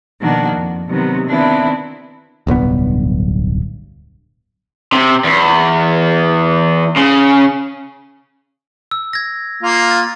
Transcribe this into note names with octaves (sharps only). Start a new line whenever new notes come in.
B2 D#3 F3 A#3 D4 F#4
F2
C3 D#3 F#3 B3
D#3 B3 C4 D4 E4
D1 B1 G2 B3
C3
E2
C#3
E6
G#6 A#6
A#3 F4
A6